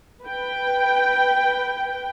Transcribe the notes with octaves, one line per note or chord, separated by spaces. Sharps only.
B4 G5